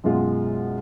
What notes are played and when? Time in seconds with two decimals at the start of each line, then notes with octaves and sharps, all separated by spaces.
0.04 F#2 B2 G#3 F4